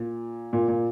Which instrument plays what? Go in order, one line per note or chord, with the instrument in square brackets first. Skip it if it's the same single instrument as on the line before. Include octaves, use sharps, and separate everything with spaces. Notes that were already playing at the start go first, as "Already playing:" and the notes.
Already playing: [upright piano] A#2
A#2
A#2